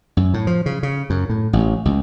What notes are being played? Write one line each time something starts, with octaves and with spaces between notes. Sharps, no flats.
F#2
A2
F3
C#3
C#3
F#2
A2
A1
C#2